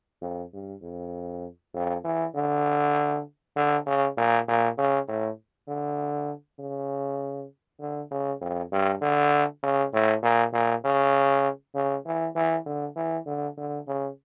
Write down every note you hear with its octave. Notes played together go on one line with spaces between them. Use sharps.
F2
G2
F2
F2
E3
D3
D3
C#3
A#2
A#2
C#3
A2
D3
C#3
D3
C#3
F2
G2
D3
C#3
A2
A#2
A#2
C#3
C#3
E3
E3
D3
E3
D3
D3
C#3